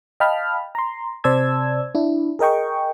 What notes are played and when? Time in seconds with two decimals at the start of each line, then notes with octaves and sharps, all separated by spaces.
0.20 D#5 F5 G5 A5 B5 F6
0.75 A#5 C6
1.24 C3 C5 D5 A5 E6 G#6
1.95 D4 E4
2.39 G#4 A#4 D#5 G5 C#6